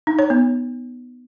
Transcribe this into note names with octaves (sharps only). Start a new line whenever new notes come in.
D#4
C#5
B3